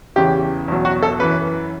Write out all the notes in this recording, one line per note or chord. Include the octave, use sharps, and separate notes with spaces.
E2 C#3 E3 G4
E2 B2 F#3
F#4
A4
F#2 E3 B4